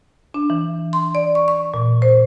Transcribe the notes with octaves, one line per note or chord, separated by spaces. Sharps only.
D4
E3
C6
D5
C#6
C#6
A#2
C5